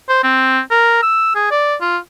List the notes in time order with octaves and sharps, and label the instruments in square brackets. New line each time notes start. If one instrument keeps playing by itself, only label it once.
[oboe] C5
C4
A#4
E6
G#4
D5
F4